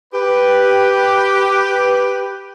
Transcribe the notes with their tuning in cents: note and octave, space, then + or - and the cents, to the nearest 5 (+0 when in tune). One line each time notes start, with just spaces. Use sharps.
G4 +0 B4 +0